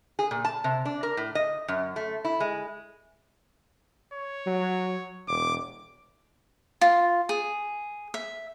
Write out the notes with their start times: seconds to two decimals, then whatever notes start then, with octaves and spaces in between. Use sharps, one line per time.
0.19 G#4
0.31 A#2
0.45 A5
0.64 C3
0.85 D4
1.03 A#4
1.17 A2
1.35 D#5
1.68 F#2
1.96 A3
2.25 E4
2.40 G#3
4.14 C#5
4.47 F#3
5.28 E1 D6
6.81 F4
7.29 G#4
8.14 E5